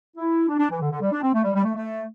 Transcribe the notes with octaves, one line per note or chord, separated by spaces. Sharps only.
E4
D4
D4
E3
D3
D3
G3
D4
C4
A3
G3
G3
A3
A3